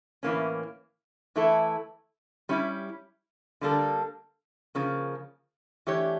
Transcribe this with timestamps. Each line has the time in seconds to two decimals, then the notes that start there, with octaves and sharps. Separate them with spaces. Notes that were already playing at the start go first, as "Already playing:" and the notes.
0.23 A2 E3 A#3 C#4
1.36 E3 A3 E4 A4
2.49 G3 C#4 E4 G4
3.61 D3 G3 A#3 D4 A4
4.75 C#3 F3 A#3
5.87 E3 A3 D4 G4 C#5